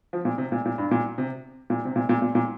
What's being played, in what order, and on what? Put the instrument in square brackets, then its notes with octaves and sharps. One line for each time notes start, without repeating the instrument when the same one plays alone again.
[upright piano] F3
A#2
C3
A#2
A#2
G2
A#2
C3
A#2
C3
A#2
A#2
A#2
A#2